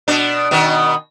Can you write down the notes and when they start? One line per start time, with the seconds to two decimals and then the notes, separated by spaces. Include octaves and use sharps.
0.08 B2 D4
0.51 B2 D#3 B3